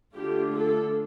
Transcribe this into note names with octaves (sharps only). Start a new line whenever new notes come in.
D3 A3 D4 F4 G4
A4